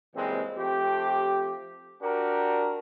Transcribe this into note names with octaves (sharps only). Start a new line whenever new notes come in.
A#2 C#3 E3 G3 G#3 C4
F3 A3 C4 G4
D4 F#4 G4 A#4